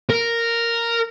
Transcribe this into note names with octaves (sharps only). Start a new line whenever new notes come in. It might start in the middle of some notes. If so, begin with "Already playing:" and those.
A#4